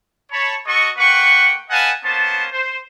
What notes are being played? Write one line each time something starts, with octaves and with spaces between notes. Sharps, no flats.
C#5 A5 B5
F#4 A4 D#5 C#6
A#3 B4 F#5 G5 C#6
B4 D#5 F5 F#5 G#5 A5
A#3 B3 C#4 C5 A5
C5